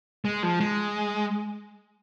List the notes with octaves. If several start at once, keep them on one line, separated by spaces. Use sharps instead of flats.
G#3
F3
G#3